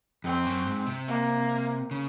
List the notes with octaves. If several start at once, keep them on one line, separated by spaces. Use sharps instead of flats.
F2 C4
F#2
G#2
C3
A#3
C#3